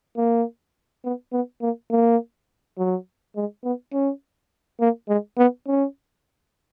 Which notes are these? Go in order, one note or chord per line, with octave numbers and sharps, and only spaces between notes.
A#3
B3
B3
A#3
A#3
F#3
G#3
B3
C#4
A#3
G#3
B3
C#4